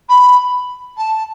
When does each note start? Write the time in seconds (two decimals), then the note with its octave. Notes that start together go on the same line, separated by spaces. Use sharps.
0.09 B5
0.97 A5